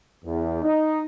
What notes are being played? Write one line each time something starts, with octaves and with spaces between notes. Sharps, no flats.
E2
D#4